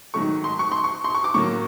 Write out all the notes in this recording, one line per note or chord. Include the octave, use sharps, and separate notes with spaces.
G#2 D#3 F#3 A3 C#6
C6
C#6
C6
C#6
C6
C#6
D6
A2 F#3 A#3 C#6